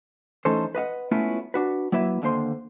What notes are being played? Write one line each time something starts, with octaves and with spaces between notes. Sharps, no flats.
E3 A3 C#4 D#4 A4 C5
B4 D#5 F5 F#5
G#3 A3 B3 C#4 E4 F4
D4 F#4 B4
F#3 A#3 E4 B4 E5
D#2 D3 A#3 C5 C6